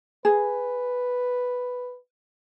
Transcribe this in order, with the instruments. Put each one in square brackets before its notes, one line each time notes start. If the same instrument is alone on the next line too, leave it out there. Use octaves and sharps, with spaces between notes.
[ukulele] G#4 [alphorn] B4